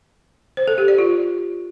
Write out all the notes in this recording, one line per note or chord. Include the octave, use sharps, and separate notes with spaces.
C5
A4
G4
D5
F4